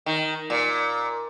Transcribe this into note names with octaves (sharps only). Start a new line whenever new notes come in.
D#3
A#2